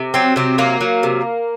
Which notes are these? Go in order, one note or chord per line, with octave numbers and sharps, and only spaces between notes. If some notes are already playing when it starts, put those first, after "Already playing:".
Already playing: C3
F#3 C4
C3 C4
F#3 A#3
F#3
C3